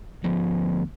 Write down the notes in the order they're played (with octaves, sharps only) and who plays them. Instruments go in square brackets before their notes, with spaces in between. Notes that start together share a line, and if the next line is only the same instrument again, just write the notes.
[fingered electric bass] D2 F3 B3